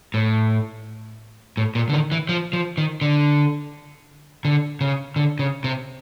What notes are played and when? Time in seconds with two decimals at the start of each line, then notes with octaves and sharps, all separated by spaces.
0.14 A2
1.57 A2
1.75 A#2
1.89 D3
1.93 D#3
2.12 E3
2.29 F3
2.53 F3
2.78 D#3
3.01 D3
4.45 D3
4.81 C#3
5.16 D3
5.39 C#3
5.64 C3